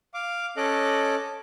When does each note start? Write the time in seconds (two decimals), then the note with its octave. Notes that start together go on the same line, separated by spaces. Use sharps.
0.14 F5 D6
0.57 C#4 A4 D#5 D6 F#6